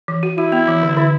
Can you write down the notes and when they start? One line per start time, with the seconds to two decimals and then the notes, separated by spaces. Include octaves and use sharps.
0.08 E3
0.23 F#4
0.37 E4 F#4
0.52 B3
0.68 E3
0.83 D3
0.97 D3